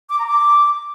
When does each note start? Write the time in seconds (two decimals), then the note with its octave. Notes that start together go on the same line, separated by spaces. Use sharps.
0.10 D6
0.19 A#5
0.27 D6